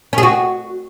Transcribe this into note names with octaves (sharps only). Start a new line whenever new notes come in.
C#4
G#4
F#4